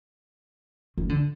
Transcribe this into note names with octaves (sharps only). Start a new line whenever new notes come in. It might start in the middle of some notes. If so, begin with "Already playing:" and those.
D#3
D3